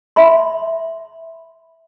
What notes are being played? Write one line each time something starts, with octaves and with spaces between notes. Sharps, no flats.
E5 B5 C6